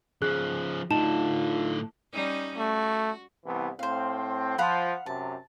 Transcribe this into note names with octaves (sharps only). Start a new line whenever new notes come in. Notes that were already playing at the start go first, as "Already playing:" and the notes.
C#3 F3 G#4 F#6
A2 D3 D#4 F4 A5 E7
G3 C#4 D#4
A3 F#4
C2 E3 B3
A2 C4 C5 F5
F3 F5 F#5 B5
F#2 C3 A5